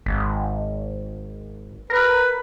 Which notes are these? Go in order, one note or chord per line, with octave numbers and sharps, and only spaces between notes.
G#1
A#4 B4